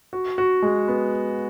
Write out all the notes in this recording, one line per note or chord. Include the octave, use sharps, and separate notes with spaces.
F#4
F#4
G#3
B3